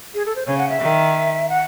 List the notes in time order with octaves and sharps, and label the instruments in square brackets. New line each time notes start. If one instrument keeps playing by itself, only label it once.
[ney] G#4
A4
C5
[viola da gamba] C#3 [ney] C#5
[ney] F#5
E5
[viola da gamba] D#3
[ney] F#5